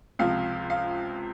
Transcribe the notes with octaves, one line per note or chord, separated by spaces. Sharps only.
C#2 C3 F3 F5
F5